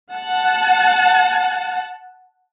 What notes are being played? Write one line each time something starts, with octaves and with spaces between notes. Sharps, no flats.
F#5 A5